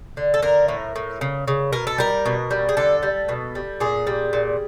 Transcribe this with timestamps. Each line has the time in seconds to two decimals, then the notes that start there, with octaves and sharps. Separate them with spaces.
0.17 D3
0.34 A4
0.42 D3 A#4
0.68 A2
0.96 A2
1.21 C#3
1.48 C#3
1.73 B2 A#4
1.87 A4
1.98 G3 A#4
2.26 B2
2.51 G3
2.69 G#4
2.77 D3 A4
3.03 G3
3.29 B2
3.55 G3
3.80 A#2 G#4
4.07 G3
4.33 A#2